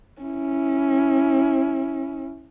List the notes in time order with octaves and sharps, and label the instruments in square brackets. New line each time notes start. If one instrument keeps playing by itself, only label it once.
[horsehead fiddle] C#4 E4